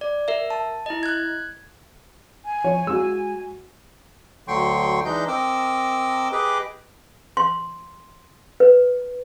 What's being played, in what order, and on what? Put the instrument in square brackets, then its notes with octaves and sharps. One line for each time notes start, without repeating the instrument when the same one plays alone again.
[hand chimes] D5
A#4 E5
A5
E4 D#5
F#6 G#6
[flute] G#5
[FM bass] F3 [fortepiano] C#5
[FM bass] G#3 [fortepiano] F#4 E6
[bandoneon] D2 D3 F#3 G5 C6 C#6
E3 G#3 D4 D#4 D#5 G6
C4 A#4 D#5 D6 E6
G4 G#4 B4 D#5 D6
[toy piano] C6
B4